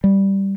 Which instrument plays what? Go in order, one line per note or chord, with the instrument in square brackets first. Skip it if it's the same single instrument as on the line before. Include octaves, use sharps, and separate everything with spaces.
[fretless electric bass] G3